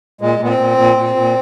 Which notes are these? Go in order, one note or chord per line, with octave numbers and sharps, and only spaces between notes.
A#2 G#3
A#2 B3
C4
A#2
A#2
A#2
A#2